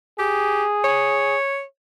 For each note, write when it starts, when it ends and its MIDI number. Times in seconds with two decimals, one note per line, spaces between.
0.19 0.64 67
0.19 1.36 68
0.84 1.63 73